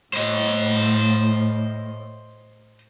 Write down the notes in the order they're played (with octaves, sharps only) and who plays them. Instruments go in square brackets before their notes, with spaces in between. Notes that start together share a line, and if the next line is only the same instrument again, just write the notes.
[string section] A2 [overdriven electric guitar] C5 D#5